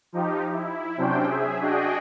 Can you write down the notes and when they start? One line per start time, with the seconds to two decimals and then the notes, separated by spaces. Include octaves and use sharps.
0.13 F3 D#4 G4
0.53 E4
0.97 C3 F#3 C#4 D4 C5 G5
1.27 G#4 E5
1.60 D4 F#4 G#4 D#5 G5